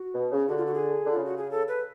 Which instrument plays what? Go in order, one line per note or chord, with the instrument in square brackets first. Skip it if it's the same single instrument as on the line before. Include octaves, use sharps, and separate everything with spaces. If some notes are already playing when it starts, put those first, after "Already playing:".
Already playing: [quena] F#4
[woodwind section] B2
C#3
[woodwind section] D3 [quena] F#4
[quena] F4
F#4
G#4
[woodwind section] D3
[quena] F4
[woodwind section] C#3
[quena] F#4
G#4
A4
B4